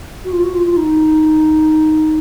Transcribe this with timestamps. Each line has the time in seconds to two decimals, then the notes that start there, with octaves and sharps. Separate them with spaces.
0.25 F#4
0.33 F4
0.43 F#4
0.54 F4
0.66 F4
0.77 D#4